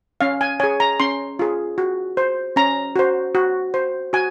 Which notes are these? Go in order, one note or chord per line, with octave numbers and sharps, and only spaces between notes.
C#4 F5
G#5
G#4 C#5 G#5
A#5
C#4 C6
F4 G#4
F#4
C5
C#4 A#5
F#4 C5
F#4
C5
F#4 G#5